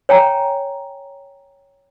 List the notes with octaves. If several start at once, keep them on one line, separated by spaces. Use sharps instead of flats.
C#5 G5 G#5 A#5